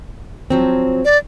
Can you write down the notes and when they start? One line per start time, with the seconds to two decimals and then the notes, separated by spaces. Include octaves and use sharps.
0.50 F3 F#3 C4
1.05 D5